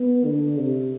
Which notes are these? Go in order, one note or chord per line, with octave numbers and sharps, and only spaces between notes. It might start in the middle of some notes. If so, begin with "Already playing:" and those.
Already playing: B3
D3
C3